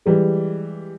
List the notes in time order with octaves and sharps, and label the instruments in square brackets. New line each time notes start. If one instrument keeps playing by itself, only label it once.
[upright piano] E3 G3 G#3